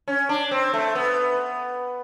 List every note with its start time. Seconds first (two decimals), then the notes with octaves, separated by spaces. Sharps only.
0.08 C#4
0.29 D4
0.51 C4
0.73 A3
0.95 B3